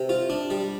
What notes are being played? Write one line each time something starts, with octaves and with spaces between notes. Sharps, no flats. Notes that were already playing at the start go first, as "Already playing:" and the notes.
Already playing: C3
F4
D4
G3